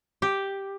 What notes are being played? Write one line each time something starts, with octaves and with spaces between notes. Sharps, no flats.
G4